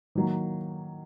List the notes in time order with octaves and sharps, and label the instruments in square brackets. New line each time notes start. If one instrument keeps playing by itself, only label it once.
[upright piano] D#3 F#3 A#3